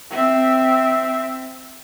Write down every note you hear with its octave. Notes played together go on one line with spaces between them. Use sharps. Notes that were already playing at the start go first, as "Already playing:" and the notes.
C4 E5